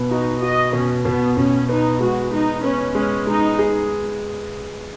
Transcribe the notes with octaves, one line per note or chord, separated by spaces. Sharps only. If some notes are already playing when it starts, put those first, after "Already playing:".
Already playing: B2 B3
D#4 F#4
F#4 D#5
B2 C#4
B2 B3
B2 C#4
B3 D#4
G#3 F#4
G#3 D#4
B3 C#4
G#3 C#4
G#3 D#4
G#4